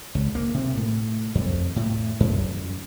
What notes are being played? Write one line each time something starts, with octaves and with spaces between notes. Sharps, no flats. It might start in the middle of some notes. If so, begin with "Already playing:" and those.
C#2
A#3
C3
A2
F2
A2
F#2